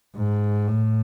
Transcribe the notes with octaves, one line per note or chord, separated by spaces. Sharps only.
G#2
A2